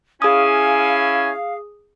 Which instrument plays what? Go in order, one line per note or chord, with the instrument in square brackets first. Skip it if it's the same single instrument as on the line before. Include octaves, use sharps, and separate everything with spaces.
[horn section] C#4 E4 G#5 [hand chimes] G#4 D#6 [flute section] F5